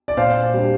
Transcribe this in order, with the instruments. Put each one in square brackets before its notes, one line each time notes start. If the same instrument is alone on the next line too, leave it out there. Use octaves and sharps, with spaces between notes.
[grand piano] D5
A#2 C5 F5
G3 D4